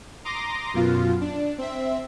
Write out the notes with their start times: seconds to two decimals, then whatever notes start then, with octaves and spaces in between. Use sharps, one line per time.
0.25 A#5 C6 D6 D#6 A#6
0.74 F#2 B2 F4
1.21 D4
1.58 C4 E5